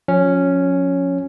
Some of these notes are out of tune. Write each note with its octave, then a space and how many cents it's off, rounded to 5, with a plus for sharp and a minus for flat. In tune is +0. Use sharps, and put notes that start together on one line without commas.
F3 +40 C#4 +0